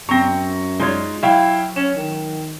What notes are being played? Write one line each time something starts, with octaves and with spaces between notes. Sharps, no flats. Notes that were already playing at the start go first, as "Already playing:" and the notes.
F#2 C4 A#5 C#6 A#6
G#3 D#4 F4 C#5
F#3 E4 E5 F5 G5
C#4 E7
D#3